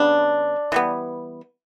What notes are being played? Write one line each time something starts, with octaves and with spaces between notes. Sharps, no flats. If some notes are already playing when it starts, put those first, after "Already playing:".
Already playing: C#3 G3 B3 D4
E3 G3 B3